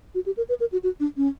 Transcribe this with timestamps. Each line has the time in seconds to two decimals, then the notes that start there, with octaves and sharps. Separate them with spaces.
0.15 F#4
0.26 G4
0.37 A#4
0.49 B4
0.60 A#4
0.72 F#4
0.83 F#4
1.00 D4
1.17 C#4